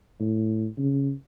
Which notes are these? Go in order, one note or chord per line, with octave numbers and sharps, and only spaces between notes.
A2
C#3